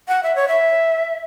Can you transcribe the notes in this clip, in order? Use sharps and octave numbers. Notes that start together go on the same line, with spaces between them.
F#5
E5
C#5
E5